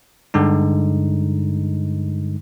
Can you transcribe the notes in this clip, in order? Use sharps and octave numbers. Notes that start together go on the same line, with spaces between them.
G2 D3 G#3 D#4